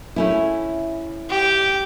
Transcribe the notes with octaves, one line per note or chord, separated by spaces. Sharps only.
A3 C#4 E4
G4